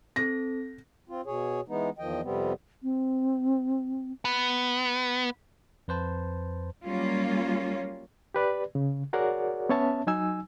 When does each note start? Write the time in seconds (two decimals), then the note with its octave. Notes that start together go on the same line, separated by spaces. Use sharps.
0.16 C4 A4 A#6
1.09 C4 F4
1.26 B2 G#4 C#5
1.68 E3 G#3 B3 D#4
1.99 E2 D#3 F3 D#5 G5
2.23 F2 C3 G3 B3 C4
2.83 C4
4.25 B3
5.88 F2 B4 C5 A5
6.85 F#3 G3 A#3 C#4 F4
8.35 G4 B4 D5
8.75 C#3
9.13 F#4 G#4 A#4 C#5 D5 F#5
9.69 B3 C#4 C#5 E5 A5
10.07 F#3 D#4 G#5 E6